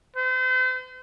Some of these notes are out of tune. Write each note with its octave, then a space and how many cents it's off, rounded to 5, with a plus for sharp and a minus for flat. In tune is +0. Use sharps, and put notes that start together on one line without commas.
C5 -40